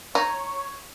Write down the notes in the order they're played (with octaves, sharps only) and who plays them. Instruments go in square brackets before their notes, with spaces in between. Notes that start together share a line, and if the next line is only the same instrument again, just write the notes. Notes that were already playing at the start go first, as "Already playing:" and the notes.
[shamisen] D#4 [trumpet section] C#5